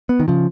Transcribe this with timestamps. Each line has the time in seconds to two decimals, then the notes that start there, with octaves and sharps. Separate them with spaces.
0.09 B3
0.20 D#3
0.28 C#3 F3